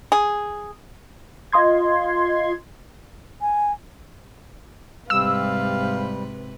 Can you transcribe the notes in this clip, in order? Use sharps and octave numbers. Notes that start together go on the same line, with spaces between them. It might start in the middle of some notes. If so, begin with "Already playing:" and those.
G#4
F4 D#5 C6 G#6
G#5
G#2 C3 G3 B4 F5 E6